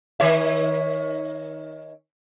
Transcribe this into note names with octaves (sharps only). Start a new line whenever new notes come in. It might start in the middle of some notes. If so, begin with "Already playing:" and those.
D#3 C#5 E5